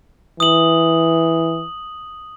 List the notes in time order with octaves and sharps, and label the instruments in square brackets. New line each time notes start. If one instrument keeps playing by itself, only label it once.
[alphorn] E3 [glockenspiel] D#6 F#7